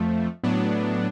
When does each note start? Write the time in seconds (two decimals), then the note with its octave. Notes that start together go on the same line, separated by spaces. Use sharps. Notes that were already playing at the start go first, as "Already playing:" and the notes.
Already playing: F2 F3 A3
0.43 A2 F#3 B3 D4